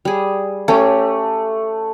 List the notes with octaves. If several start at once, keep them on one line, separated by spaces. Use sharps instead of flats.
G3 G#4
A3 C#4 G4